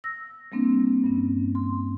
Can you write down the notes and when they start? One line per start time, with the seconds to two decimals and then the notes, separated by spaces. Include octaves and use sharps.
0.04 E6 A#6
0.52 G3 A#3 C4 D4
1.04 G2 C#4
1.55 C6